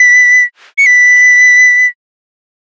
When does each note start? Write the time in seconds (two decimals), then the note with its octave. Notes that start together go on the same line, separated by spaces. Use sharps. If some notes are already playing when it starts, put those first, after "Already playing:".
Already playing: B6
0.78 C#7
0.86 B6